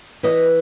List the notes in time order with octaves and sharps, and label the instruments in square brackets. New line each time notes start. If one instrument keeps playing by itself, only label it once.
[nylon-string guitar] E3 B4 D#5